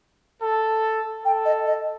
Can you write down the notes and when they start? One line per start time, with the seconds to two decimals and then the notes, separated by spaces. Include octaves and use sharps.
0.42 A4
1.25 A4 G5
1.45 D#5
1.67 D#5